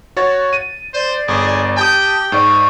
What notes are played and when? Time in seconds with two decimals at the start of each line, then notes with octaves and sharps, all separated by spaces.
0.17 F#4 C#5 A6
0.53 D#7
0.94 C5 D5
1.28 G1 G#4 D6
1.77 G4 G5 A5 D#6
2.32 G#2 D5 C#6